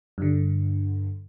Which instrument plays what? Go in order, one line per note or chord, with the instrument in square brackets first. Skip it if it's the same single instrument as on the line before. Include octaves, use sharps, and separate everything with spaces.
[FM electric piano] G2 D3